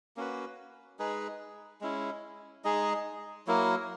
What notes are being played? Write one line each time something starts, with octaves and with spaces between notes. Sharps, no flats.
A#3 C#4 F#4 B4
G#3 D#4 G#4 B4
G#3 C#4 E4
G#3 D#4 G#4 D#5
F#3 A#3 E4 A#4